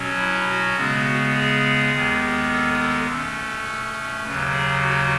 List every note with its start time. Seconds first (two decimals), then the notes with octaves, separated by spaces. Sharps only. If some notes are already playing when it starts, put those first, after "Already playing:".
Already playing: B2 F#3 C#4
0.18 E4
0.47 F#4
0.76 C#3 G#3 B3
1.33 G#4
1.92 D#2 D#3 G#3 B3
2.50 A4
2.78 A4
3.07 B2 A3 C#4 A4
4.23 D#2 C#3 F#3 B4
4.52 G#4
4.81 F#4